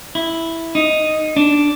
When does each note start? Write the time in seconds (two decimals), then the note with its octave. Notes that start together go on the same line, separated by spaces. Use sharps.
0.15 E4
0.75 D#4
1.37 D4